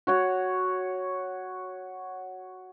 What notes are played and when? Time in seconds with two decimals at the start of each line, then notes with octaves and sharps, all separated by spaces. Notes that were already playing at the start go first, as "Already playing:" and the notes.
0.07 F#4 C#5 F#5